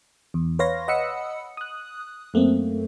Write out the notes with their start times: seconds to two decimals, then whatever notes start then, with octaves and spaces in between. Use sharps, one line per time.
0.34 E2
0.59 B4 C#5 F5 C6 A#6
0.88 D#5 F#5 B5 D#6 E6 C#7
1.57 D#6 F#6
2.34 F#2 A3 A#3 C4